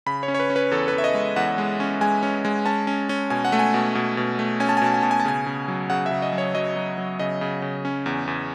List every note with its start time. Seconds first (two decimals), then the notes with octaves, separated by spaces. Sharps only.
0.06 C#3 B5
0.23 C#5
0.28 C#4
0.34 C#5
0.40 B4
0.50 C#4
0.56 B4
0.71 E2 A4
0.88 B4
0.93 E2
0.98 E5
1.04 D#5
1.14 G#3
1.36 E2 F#5
1.58 G#3
1.80 C#4
2.01 G#3 G#5
2.23 C#4
2.45 G#3
2.66 C#4 A5
2.87 C#4
3.09 C#4
3.30 B2 G#5
3.45 F#5
3.52 A3
3.59 G#5
3.74 B2
3.95 B2
4.17 B2
4.39 A3
4.60 C#4 G#5
4.69 A5
4.77 G#5
4.82 B2 A5
4.94 G#5
5.03 B2 A5
5.11 G#5
5.20 A5
5.25 C#3 G#5
5.46 C#3
5.68 F#3
5.90 C#3 F#5
6.06 E5
6.11 C#3
6.22 D#5
6.33 F#3
6.38 C#5
6.55 F#3 D#5
6.76 F#3
6.98 F#3
7.19 C#3 D#5
7.41 C#3
7.62 C#3
7.85 C#4
8.06 E2
8.27 E2